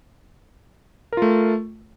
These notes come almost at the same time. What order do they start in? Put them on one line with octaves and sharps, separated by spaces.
A#4 F4 A3